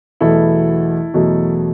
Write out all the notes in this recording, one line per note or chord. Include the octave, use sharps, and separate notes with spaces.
E2 B2 F#3 A3 E4 A4
E2 B2 F#3 A3